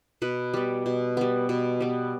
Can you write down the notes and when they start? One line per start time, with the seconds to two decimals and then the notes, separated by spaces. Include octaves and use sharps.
0.22 B2 B4
0.54 G3 B3
0.86 B2
1.17 G3 B3
1.49 B2
1.81 G3 B3